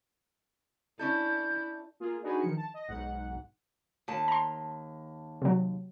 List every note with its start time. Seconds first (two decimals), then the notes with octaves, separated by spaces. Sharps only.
0.99 C#4 D4 E4 A4 G6
2.00 A#3 F4 G#4
2.23 D4 D#4 F#4 G#4 B4 G#5
2.41 D#3 F3 C#7
2.57 A5
2.74 D#5 A#6
2.88 B1 G#2 F#5
4.08 D#2 A5
4.28 A#5 C6
5.42 C3 F#3